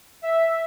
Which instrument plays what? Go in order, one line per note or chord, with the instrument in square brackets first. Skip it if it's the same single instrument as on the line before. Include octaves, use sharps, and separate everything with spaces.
[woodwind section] E5